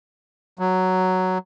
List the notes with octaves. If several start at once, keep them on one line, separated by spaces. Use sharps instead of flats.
F#3